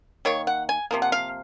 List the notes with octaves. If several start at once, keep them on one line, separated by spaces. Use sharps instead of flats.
D#3 A#3 C#5
F#5
G#5
C3 F3 A#3
F#5
F5